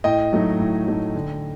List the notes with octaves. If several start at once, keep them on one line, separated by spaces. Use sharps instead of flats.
A2 D#5 G5
F#3 A3 D#4
A2
F#3 A3 D#4
D3